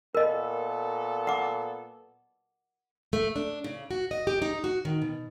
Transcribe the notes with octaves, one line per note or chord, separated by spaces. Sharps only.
A#2 B3 A4 A#4 D#5
F#5 D6
A3
D4
C#3
F#4
D#5
G4
D#4
F#4
D#3
B2